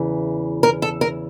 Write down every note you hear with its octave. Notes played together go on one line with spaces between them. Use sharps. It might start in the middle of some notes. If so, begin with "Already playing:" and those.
Already playing: E2 C#3 E3
A#4
A4
A#4